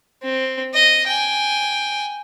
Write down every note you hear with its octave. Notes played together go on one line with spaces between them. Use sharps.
C4
D#5
G5 G#5